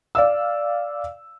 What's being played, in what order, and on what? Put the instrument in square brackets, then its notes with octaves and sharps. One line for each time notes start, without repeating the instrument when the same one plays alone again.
[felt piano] D5 F5 E6